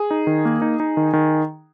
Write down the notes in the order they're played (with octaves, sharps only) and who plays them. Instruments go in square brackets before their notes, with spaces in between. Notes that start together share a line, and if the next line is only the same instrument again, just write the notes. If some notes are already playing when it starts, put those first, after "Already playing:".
Already playing: [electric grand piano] G#4
D#4
D#3
A#3
D#4
D#4
D#3
D#3